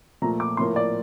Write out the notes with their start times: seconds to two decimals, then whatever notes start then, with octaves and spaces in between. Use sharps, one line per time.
0.22 A#2 F3 A3 A#5
0.40 D6
0.57 A2 F3 A#3 C6
0.76 D5